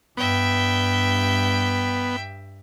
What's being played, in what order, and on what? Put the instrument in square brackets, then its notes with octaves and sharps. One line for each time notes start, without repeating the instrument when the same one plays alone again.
[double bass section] G2 [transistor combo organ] B3 [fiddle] E5 G5